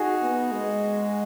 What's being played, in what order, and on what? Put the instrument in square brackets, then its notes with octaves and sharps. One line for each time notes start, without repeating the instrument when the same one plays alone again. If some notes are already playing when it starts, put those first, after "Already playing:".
Already playing: [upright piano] D#4 F#4 G#4
[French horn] B3
G#3